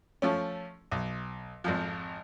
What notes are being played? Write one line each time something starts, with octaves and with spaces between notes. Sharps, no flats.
F3 A3 C#4
B1
G#1 F2 F3